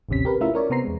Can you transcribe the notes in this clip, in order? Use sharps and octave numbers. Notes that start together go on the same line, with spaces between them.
A1 D#2 C3 C#4 B6
G4 A#4 B4
A3 C#4 E4 F4 A#4 E5
C#4 A#4 C#5 D5
C3 B3 C5 A#5 C7
E2 G#3